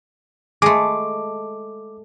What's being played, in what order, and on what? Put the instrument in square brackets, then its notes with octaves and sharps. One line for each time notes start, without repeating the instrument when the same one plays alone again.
[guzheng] G#3 A3 [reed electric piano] D6